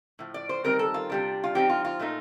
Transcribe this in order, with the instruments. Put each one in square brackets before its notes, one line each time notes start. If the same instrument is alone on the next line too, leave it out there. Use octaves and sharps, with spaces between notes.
[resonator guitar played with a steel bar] A2 F3
D5
C5
D#3 G3 C4 D#4 A#4
A4
F4
C3 G3 D4
F4
F3 C4 D#4 G4
F4
F4
A#2 A3 D#4